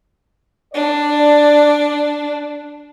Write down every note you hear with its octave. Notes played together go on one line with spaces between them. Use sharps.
D4 D5